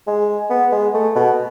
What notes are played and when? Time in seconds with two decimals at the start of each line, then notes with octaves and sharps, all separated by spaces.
0.07 G#3
0.50 B3
0.72 G#3
0.94 A3
1.15 B2